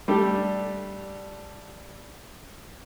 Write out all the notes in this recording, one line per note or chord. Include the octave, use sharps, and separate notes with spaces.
G3 A3 D4 G4 A4